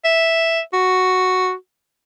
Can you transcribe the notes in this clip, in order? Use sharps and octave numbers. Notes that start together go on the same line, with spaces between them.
E5
F#4